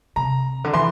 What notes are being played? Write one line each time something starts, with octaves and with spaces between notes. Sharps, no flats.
C3 A#5
D3
E3 C6